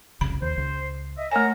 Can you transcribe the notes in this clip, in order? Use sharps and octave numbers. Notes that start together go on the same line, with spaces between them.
F1 C2 C#3 B5
D#2 C5
C#2
D#5 E5
A3 A#4 C#5 G#5 A#5